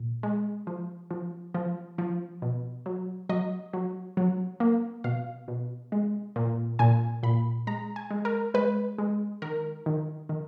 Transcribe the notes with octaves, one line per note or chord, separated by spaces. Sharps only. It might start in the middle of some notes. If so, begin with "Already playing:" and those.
Already playing: A#2
G#3
F3
F3
F3
F3
B2
F#3
F#3 D#5
F#3
F#3
A#3
B2 F5
B2
G#3
A#2
A#2 G#5
A#2 B5
G#3 A#5
G#5
G#3
A#4
G#3 B4
G#3
D#3 A#4
D#3
D#3